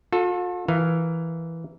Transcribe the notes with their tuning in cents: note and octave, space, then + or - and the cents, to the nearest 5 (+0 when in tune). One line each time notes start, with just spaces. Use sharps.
F4 +45 A4 +0
E3 +0 A#4 +0 F5 +0